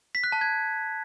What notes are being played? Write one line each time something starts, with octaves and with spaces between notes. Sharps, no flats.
B6
F#6
A5
G#6